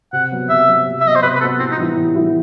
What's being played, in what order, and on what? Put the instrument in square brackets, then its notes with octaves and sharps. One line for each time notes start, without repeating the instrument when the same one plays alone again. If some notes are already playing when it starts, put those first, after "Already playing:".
[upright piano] C3 [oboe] F#5
[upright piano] F#3 B3
[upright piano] C3 [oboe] E5
[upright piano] F#3 B3
C3
[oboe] E5
[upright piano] F#3 B3 [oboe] D#5
[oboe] C5
[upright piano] C3 [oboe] B4
[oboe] B4
[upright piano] F#3 B3 [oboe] A4
[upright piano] A2 [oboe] C4
[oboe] D#4
[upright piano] E3 G3 B3 E4
A2
E3 G3 B3 E4